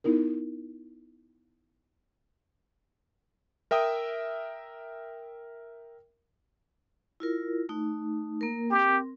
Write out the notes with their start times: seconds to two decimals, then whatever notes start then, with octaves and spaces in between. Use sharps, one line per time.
0.04 B3 D#4 E4 A#4
3.71 A#4 E5 G5 D#6
7.20 E4 F4 A#4
7.69 A3 D#4
8.41 A#3 A#4
8.71 C4 G4 A#4